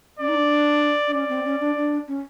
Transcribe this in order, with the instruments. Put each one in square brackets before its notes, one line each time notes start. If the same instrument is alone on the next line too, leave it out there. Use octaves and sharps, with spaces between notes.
[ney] C#4 [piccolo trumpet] D5
[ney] D#4
D4
D4
[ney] C#4 [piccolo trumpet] D5
[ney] C4
C#4
D4
D4
C#4